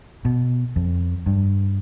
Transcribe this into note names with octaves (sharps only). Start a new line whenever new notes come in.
B2
F2
G2